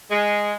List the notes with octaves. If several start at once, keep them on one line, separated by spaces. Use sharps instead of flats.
G#3